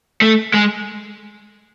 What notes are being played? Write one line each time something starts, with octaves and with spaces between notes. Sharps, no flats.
A3
G#3